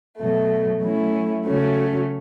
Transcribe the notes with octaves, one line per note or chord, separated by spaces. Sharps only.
B2 F#3 A3
F#3 A3 C#4 E4
C#3 F#3 A3 C#4